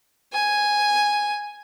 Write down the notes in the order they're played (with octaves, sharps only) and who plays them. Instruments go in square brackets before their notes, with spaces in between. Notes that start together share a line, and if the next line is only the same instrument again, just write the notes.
[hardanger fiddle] G#5